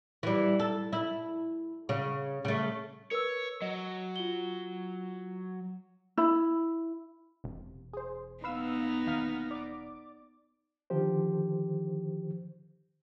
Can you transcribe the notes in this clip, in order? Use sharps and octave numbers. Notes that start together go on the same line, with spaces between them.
E3 G3
A4
E4
C#3
C#3 A3
A#4 B4 C#5 E6
F#3 D#5
F4 G7
E4
E1 C3
G#4 C5
B3 D#4 B4 F5 E6
D#2 F5 F6
D5 D6
D3 D#3 F3 G4 C5